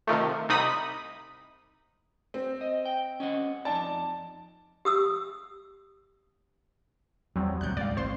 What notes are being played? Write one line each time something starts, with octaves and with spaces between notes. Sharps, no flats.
C3 D#3 F3 A3
C2 C3 D#4 B5 D#6
C4
D#5
G5
C#4 D#5 F#5
F2 D#4 D5 A5
G4 D#6 E6
E2 F#3 G3 C4
D2 A#2 F#6 G6
C#2 G#2 G3 D5 F5
A1 C4 C5 C6